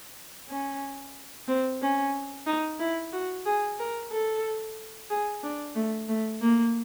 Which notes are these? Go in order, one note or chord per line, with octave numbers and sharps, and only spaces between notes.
C#4
C4
C#4
D#4
E4
F#4
G#4
A#4
A4
G#4
D4
A3
A3
A#3